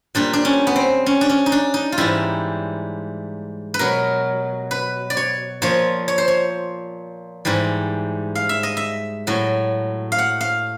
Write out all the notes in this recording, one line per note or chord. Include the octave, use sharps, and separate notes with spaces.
A#2 G3 D4
D4
C#4
B3
C4
C#4
D4
C#4
D#4
D4
D#4
F4
G#2 E3 G3 E4
B4
B2 F#3 A#4
B4
D5
C#5
A#2 F3 C#5
C#5
C5
C#5
G#2 E3 G3
F5
E5
D#5
E5
A2 F#3
F5
F#5
F5